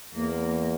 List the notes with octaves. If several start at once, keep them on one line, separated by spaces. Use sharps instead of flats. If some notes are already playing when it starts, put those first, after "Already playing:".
E2 A#3